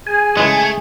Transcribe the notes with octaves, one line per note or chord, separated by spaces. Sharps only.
G#4 G#5
C#3 E3 G#3 A3